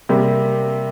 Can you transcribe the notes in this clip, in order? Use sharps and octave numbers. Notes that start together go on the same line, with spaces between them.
C3 G3 A#3